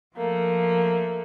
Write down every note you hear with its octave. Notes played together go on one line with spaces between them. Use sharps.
F3 A3 A#3